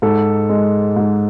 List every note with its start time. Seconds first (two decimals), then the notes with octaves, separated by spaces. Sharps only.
0.02 G#2 A4
0.49 G#3
0.96 G#2